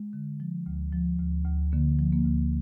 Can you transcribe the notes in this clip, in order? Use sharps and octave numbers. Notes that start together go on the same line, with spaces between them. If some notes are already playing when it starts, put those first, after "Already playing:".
Already playing: G#3
D3
F3
D2
F3
D2
D2
D3 A#3
F3
A#3
D2